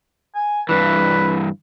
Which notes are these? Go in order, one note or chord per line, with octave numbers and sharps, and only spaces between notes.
G#5
G2 E3 B4